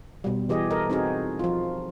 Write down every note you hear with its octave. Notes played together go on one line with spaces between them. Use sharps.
B2 G3
E3 G4 G#4 D#5
A4 A#4 D#5
C4 D#4 F#4 G#4
F3 F4